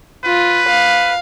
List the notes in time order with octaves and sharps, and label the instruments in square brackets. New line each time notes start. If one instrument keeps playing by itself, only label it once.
[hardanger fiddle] F4 [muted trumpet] B4
[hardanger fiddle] F5